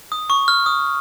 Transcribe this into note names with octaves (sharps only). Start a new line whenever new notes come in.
D#6
C#6
F6
D#6